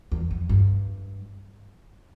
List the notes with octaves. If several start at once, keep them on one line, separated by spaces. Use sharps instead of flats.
E2
F2
G2